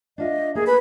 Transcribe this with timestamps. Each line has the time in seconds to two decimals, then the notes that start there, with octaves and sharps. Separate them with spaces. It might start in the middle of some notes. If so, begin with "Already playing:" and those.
0.18 D4 F4 D#5 E5
0.55 A#3 G#4 A#4
0.67 B4 B5